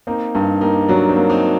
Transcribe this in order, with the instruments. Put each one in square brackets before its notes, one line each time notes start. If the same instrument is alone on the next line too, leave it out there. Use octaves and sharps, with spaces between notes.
[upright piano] A#3 [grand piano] C4 D#4
[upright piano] G2 [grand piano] D#4 G4
[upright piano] A#3 [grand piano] D#4 G4
[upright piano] F#3 [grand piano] D4 F#4
[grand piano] C4 D#4
[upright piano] A#3
[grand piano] C4 D#4